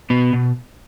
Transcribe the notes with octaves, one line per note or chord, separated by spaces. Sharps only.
B2 B3
B2